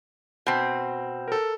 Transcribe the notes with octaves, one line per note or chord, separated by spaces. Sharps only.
B2 C4
A4 A#4